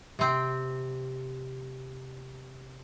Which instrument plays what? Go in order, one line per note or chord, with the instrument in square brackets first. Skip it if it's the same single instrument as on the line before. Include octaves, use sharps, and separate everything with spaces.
[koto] C3 C4